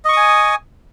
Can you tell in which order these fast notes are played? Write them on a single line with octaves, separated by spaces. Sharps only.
D#5 C#6 D#6 G#5